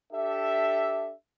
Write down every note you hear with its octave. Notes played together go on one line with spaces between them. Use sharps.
D4 G4 A4 E5